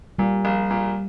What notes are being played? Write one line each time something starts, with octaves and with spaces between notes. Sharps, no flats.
A#2 G3
A#1
A#2